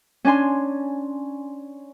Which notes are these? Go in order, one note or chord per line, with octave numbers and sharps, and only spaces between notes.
C#4 D4 G#5 C6